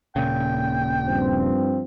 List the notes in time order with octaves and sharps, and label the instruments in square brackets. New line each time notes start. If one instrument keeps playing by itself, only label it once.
[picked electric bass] D#1 A#2 C#3 [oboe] G5
[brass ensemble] G2 F3 C4